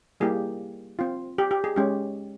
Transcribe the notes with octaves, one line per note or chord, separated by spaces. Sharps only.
G3 A#3 E4 G4 G#4
C4 F4
G4
G4
G#4
G#3 C#4 G4